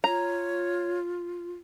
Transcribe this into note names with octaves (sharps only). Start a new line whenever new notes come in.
F4 C#5 A#5